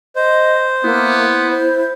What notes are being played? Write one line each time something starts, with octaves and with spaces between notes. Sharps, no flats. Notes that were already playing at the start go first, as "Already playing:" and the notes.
C5 D#5
A#3 B3 E4
C5